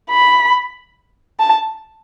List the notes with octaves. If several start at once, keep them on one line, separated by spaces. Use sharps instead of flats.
B5
A5